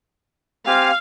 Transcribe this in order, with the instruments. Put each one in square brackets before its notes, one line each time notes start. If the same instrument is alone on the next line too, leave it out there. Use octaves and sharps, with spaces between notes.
[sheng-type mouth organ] C4 G4 G#5 [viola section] F5